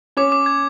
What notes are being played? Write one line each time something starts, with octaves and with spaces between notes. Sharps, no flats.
C#4 C#5 D6
D6
G#6